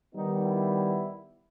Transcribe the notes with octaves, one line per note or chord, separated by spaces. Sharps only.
D#3 G3 B3 D#4
E4